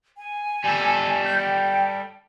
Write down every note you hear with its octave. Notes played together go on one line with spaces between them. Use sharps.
G#5
G3 A4
G6
G5